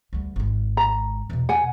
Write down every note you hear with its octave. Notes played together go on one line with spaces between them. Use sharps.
D2 G3
G#1 G#3
A#5
E2 B2
F#5 G#5